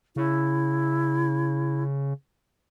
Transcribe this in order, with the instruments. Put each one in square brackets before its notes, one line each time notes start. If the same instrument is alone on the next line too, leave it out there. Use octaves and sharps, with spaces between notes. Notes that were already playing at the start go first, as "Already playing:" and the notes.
[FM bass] C#3 [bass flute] E4